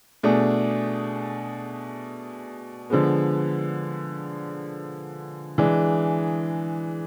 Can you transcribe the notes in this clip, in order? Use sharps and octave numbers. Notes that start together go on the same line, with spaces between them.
B2 A3 D4 G#4
D3 F3 G#3 B3
E3 G#3 D4 G#4